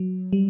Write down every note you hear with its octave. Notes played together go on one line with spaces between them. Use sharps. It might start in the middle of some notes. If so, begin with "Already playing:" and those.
Already playing: F#3
G3